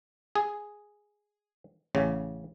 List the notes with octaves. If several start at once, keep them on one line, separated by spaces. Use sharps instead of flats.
G#4
A1 C#3